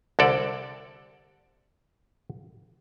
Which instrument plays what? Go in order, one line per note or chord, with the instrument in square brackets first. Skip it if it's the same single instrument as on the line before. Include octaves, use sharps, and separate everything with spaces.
[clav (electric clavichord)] C2 D3 A4 D5